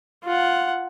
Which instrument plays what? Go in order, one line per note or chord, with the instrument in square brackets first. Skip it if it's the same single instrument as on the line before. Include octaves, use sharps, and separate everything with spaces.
[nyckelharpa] F4 F#5